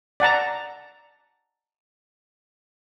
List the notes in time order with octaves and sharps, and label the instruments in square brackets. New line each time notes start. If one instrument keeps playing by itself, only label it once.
[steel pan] D5 F#5 A5 A#5